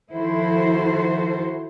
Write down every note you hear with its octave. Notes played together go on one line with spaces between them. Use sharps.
D#3 F3 E4 F#4 A4 C5